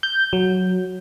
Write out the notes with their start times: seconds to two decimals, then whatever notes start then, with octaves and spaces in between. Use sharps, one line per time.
0.03 G6
0.33 F#3